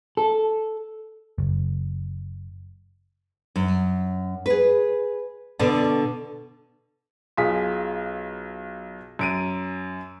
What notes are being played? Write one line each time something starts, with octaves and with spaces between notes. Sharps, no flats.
A4
F#1
F#2
G#4 B4
B2 D3 D4 A4 D5 A5
B1 F4 G#4 B6
F#2 D7 D#7